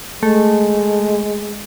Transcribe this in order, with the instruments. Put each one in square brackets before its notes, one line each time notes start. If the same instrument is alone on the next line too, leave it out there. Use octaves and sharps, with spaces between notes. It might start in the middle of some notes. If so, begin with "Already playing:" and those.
[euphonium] G#3 [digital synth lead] A3